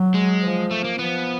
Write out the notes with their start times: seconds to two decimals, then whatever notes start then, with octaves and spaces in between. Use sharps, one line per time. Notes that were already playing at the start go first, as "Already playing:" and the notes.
Already playing: F#3
0.14 G#3
0.43 F3
0.71 A3
0.84 A#3
0.99 F3 B3